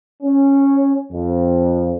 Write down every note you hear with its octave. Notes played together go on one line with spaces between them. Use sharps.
C#4
F2